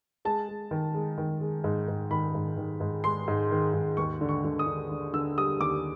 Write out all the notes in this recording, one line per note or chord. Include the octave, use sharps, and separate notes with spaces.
G#3 A5
G#3
D#3
G#3
D#3
G#3
G#2
G#2
D#3 B5
G#2
D#3
G#2
G#3 C6
G#2
D#3
G#2
D#2 C#6
D3
C#6
D3
D#6
D3
D3
D3 E6
G3 D#6
D#2 D6